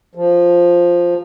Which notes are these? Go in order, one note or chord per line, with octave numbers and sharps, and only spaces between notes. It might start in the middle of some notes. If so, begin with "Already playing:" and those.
F3